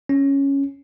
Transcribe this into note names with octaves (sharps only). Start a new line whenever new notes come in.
C#4